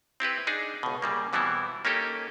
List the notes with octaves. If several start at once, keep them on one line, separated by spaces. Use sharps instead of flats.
C4 E4 G4 B4
D4 D#4 G#4
C#2 B2
C#3 G3 A#3
B2 E3 G3 B3 C4 E4
A#3 C#4 D#4 G4 A4